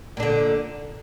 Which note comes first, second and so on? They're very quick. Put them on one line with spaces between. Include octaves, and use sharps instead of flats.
A#2 D4 D3